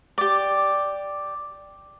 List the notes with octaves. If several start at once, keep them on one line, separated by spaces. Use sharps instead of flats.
G4 D5